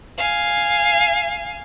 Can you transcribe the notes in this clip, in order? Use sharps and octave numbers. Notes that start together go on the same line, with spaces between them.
F5 G#5